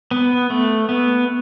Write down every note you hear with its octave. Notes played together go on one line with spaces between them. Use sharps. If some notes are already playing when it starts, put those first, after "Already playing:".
B3
A3
B3